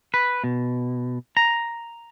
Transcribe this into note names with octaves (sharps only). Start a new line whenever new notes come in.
B4
B2
A#5